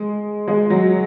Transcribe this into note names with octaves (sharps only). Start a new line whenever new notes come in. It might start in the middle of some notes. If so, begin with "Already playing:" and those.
Already playing: G#3
G#3
F#3